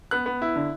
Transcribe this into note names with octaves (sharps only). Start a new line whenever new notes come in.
B3 F#6
B3
E4
D3